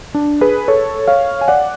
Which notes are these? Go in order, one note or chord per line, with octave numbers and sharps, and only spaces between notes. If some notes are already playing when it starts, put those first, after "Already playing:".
D4
G#4 B4
A4 C#5
C#5 F5
G#5
D5 F#5